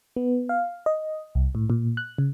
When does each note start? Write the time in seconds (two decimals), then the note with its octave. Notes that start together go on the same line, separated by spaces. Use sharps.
0.16 B3
0.49 F5
0.86 D#5
1.35 C2
1.55 A2
1.70 A#2
1.97 F#6
2.18 C#3